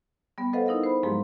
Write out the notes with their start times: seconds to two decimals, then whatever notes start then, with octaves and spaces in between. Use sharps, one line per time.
0.38 G3 B3
0.53 A4 B4 C5 D#5 F5 F#5
0.66 D#4 E4 A#4 D#5 F5
0.84 C5 B5
1.03 G#2 F3 F#3 G#3 A#3 G4